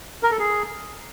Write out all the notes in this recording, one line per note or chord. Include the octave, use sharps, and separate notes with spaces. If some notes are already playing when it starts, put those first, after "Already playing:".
A#4
A4
G#4